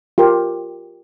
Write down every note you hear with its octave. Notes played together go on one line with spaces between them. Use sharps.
F4 G4 A#4